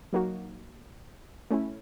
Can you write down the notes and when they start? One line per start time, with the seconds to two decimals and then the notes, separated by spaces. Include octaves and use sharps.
0.13 F#3 A#3 D#4 F#4
1.51 A3 C#4 E4